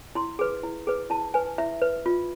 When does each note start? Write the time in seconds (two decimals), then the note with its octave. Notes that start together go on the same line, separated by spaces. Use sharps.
0.15 E4 C6
0.39 G#4 B4
0.63 E4
0.87 G#4 B4
1.10 E4 A5
1.34 B4 G#5
1.58 E4 E5
1.81 B4
2.06 F4